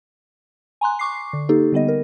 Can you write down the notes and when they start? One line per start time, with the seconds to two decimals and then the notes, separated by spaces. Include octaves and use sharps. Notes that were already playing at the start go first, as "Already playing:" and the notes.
0.81 G#5 A#5 C6 F#6
0.99 C#6 D6 C7
1.33 D3
1.49 A#3 D#4 G4 A4
1.72 D3 G3 B3 D#5
1.88 A#4